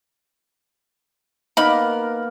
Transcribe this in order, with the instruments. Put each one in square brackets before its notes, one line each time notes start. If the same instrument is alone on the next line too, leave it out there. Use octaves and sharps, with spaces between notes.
[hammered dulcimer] A#3 B3 A#4 [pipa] D#4 B5